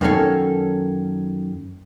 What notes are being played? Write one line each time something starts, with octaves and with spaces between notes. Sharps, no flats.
F#2 D#3 A#3 B3 C#4 A4